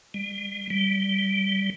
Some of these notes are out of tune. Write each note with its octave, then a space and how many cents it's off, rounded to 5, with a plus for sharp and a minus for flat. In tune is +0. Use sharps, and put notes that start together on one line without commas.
G3 +40
G3 -10